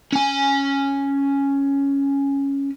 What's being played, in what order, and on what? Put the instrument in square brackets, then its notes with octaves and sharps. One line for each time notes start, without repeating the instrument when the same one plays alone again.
[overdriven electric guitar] C#4 G#5